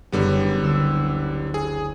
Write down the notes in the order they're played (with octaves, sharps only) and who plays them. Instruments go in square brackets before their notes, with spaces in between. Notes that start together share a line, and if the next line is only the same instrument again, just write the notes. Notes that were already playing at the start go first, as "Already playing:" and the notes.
[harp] F#1 [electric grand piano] D3 G3 B3
[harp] D2 E6
[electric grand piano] G#4